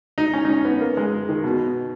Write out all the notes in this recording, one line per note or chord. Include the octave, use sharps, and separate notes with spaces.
D#4
C#4
D#4
C#4
B3
A#3
G#3
D#3
B2